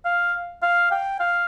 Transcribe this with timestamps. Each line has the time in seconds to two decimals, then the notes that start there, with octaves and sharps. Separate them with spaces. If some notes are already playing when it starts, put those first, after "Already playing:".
0.05 F5
0.62 F5
0.91 G5
1.20 F5